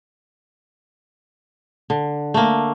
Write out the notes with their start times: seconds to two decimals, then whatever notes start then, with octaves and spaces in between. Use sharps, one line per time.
1.90 D3
2.34 A3 A#3